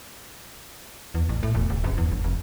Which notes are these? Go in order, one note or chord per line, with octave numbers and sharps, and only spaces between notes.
E2
A1
A2
E1
D1
F#1
E2
G1
F1